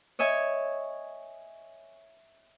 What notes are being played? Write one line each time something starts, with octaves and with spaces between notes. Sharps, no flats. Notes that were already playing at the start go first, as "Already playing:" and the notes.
C#5 D#5 E5 G#5